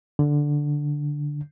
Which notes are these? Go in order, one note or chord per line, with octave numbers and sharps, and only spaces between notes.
D3